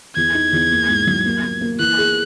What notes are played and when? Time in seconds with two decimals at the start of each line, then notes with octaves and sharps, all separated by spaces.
0.16 E2 G#6
0.35 D#4
0.53 E2
0.71 A#3
0.89 G#2
1.07 F#3
1.25 A#3
1.43 A#3
1.61 A#3
1.79 E3 F#6
1.97 G#4